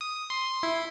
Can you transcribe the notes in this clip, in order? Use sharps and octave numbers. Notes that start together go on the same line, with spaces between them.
D#6
C6
E4